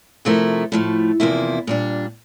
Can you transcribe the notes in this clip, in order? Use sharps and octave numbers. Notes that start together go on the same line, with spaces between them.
C3 F3 A3 E4 A#4
A2 F3 A3
E2 C3 F3 A#3 E4
A#2 G3 D4